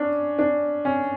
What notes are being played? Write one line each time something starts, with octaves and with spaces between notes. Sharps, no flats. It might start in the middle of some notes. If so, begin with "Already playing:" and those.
Already playing: C#4 D4
D4
C#4